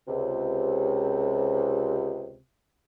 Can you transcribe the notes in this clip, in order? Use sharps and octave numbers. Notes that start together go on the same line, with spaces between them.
C#2 C3